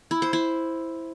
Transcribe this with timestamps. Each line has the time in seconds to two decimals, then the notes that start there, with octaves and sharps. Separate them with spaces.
0.11 E4
0.22 C5
0.33 E4